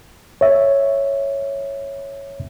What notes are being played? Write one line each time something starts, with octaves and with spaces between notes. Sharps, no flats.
C#5 E5